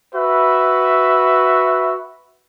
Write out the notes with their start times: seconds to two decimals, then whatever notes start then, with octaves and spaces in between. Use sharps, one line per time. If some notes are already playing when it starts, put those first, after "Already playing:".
0.15 F#4 B4 E5